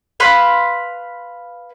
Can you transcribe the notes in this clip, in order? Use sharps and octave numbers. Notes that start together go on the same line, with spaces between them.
B4 F5 C6